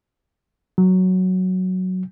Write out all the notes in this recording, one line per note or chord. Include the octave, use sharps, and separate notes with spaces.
F#3